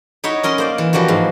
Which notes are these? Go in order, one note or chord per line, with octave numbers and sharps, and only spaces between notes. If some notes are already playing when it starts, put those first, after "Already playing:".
D#4 E4 C#5 E5 F#5 A#5
C#4 A#4 D#5 C6
A#3 C5 D5
E3
E3 F3 G3 A#3 F#4
G#2